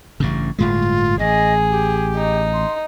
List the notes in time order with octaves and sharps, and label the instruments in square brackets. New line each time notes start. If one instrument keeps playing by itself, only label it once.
[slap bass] A1 G2 C#3
[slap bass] G1 A2 G#3 [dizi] F4
[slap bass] A1 [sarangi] G#4 [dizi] D#5
[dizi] G4
[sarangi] D#4
[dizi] C6